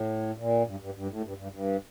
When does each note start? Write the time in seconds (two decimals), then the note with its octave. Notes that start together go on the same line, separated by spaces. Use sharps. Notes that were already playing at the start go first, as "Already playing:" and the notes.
Already playing: A2
0.37 A#2
0.66 G2
0.80 G2
0.94 G2
1.09 A2
1.23 G2
1.37 G2
1.52 G2